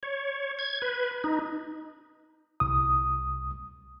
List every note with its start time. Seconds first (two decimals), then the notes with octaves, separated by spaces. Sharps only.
0.03 C#5
0.59 G#6
0.82 B4
1.24 D#4
2.60 C2 D#6